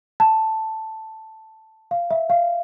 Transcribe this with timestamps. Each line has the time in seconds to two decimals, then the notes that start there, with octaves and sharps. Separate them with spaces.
0.20 A5
1.91 F5
2.11 E5
2.30 F5